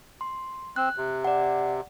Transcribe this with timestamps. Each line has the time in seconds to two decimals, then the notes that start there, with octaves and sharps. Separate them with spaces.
0.21 C6
0.76 C4 F#6
0.97 C3
1.24 D5 F#5